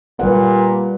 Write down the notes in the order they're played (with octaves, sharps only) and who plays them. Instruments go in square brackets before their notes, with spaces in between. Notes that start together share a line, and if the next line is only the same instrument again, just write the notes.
[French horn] A#2 [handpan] G3 B4 F#5